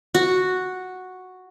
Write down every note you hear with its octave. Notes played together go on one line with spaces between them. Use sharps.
F#4